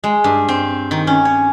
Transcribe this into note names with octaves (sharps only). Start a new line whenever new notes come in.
G#3
G2
C4
D#3
C#4
C#5